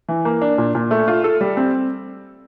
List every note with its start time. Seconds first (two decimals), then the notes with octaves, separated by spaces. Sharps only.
0.09 E3
0.25 A#3
0.42 D4
0.58 A#2
0.75 A#2
0.91 A3
1.08 F4
1.24 A4
1.41 G3
1.57 C4